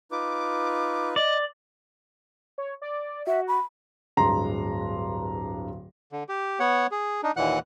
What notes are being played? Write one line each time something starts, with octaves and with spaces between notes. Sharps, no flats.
D#4 F4 B4 D6
D5 D#5
C#5
D5
F#4 E5
B5
D1 G2 G#3 A#5 C6
D3
G4
B3 C#5 F#5
G#4
D4 D#4
D#2 A#2 E3 F#5 F#6